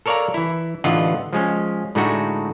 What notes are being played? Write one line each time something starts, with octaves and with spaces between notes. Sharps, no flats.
A4 A#4 C#5 D5 F5 A#5
E3 E4
A1 D3 E3 F4 D#5 F#5
F3 G#3 C#4
A2 D3 G#3 A3 D#4 F#4